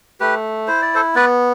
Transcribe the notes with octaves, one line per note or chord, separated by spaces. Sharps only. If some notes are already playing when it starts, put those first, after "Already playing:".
A3 G4 B4
E4 C5
D5
A4 C5
B3 B4 D5